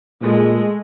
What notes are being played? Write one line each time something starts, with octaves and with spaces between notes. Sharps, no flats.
A#2 G#3 A3